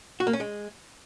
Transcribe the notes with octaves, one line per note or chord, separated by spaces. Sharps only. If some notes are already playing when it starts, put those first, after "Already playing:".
F#4
A#3
C#4
G#3